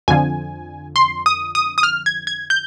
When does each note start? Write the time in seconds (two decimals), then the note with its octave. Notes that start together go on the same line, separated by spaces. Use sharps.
0.08 F2 D3 F3 G#5
0.96 C6
1.26 D#6
1.55 D#6
1.78 D#6
1.83 F6
2.06 G#6
2.27 G#6
2.50 G6